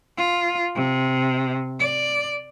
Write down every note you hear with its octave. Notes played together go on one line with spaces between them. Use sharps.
F4
C3
D5